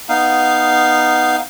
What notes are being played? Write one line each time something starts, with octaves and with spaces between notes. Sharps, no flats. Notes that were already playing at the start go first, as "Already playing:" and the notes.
B3 D#4 F5